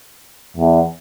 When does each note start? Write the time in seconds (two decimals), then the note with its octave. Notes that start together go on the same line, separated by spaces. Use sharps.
0.57 E2